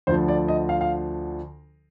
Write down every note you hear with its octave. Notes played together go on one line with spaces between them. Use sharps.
D2 D3 F3 C5
D5
D#5
F5
F5